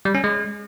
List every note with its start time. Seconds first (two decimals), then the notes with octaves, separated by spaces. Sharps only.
0.05 G3
0.15 C#4
0.24 G#3